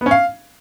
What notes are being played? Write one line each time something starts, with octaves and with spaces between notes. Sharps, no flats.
B3
C#4
F5